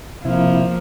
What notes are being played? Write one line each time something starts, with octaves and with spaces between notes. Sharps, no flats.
C3 F3 A#3 E4